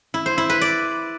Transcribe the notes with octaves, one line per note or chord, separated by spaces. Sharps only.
E4
C5
E4
B4
D5